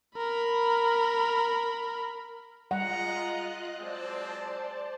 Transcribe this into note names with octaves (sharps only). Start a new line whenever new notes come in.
A#4 B5
G3 G#3 F4 D#5 F#5 A#5 F#6
F#3 G#3 C4 C5 D5 A5